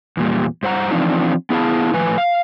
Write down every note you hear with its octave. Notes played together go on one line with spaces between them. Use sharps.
E2 A#2 G3
G2 C5 F#5 A#5
E3 F3 C4 D4 D#4 F4
B3 E4 G#4 A#4 F5 A5
A2 F3 B4 G#5
F5